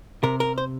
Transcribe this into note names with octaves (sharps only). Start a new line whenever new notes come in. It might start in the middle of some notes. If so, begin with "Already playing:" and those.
C3 A#4
A#4
C5